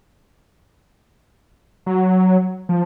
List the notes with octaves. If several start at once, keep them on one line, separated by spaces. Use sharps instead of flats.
F#3
F3